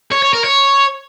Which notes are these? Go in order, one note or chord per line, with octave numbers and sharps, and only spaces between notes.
C#5
C#5
A#4
C#5